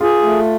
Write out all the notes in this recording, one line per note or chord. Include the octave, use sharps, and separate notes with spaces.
F4 G#4
A3